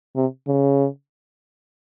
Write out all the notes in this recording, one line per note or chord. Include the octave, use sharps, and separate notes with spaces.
C3
C#3